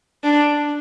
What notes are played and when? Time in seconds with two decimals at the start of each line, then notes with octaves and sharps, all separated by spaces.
0.24 D4